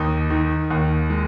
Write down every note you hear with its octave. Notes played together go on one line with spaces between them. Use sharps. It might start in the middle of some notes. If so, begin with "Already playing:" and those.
Already playing: D#2 D#4
D#3
D#2
G#3